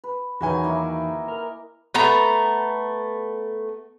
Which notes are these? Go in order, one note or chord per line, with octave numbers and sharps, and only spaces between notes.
B4
E2 D#3 E3 F#3 F#4 B4 G#5
A#3 D#4 E4
A#4
A3 B3 A#5